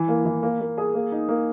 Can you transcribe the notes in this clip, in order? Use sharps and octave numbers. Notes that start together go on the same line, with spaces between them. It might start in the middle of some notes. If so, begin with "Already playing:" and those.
Already playing: E3
A#3
E3
A#3
A#3
G#4
A#3
D#4
A#3